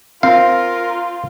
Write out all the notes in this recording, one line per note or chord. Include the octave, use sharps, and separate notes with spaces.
C4 F4 A#4 F5